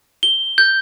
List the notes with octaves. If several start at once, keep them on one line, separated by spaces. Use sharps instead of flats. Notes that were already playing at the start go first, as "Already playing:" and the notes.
G7
G6